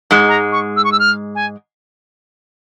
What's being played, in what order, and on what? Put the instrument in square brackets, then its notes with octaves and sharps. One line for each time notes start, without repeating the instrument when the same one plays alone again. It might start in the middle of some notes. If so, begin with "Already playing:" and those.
[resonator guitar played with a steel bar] G#2 G#3
[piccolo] A#5
C#6
E6
C#6
E6
F6
G#5